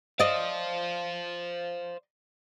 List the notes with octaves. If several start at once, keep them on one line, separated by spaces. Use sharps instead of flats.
C5 D5 D#5 F5